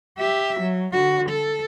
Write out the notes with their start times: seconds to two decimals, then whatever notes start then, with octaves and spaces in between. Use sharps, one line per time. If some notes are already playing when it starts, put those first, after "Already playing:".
0.19 G4 E5
0.60 F#3
0.92 D3 F#4
1.29 A4